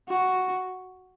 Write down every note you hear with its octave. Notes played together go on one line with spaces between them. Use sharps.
F#4